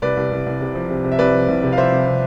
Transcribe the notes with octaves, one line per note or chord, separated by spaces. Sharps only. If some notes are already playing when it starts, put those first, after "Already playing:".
C2 B4 D5
C2
C2
C2
C3
F3
C3
C3
E5
C2 B4 D5
F3
C2
C3
F5
F3 C5 E5
C2
C3